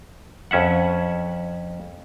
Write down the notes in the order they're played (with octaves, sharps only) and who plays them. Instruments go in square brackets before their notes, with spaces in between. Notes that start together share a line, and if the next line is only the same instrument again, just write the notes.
[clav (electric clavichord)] F2 C#4 E5 F#5